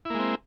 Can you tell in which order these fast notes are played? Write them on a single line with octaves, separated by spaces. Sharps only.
E4 A#3 G#3 C4